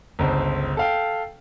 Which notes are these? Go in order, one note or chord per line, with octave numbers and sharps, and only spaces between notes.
G1 C#2 C5
A4 F5 G5